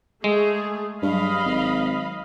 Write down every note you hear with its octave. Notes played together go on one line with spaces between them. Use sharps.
G#3 A3 G#4
G2 F#3 D#5 F5 B5
G#1